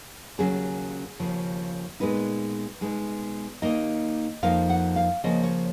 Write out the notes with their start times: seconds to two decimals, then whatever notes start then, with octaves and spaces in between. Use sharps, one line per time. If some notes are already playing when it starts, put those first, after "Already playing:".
0.38 D#2 C#3 F#3 C#4 G#4
1.19 D#2 C#3 F3
2.00 A#2 G#3 B3 D#4 B4
2.81 B2 G#3 D#4
3.62 D#2 D#3 A#3 D#4 D#5
4.43 F2 F3 A#3 D#4 F5
4.69 F#5
4.96 F5
5.24 C#3 F3 A#3 D#5
5.43 C#5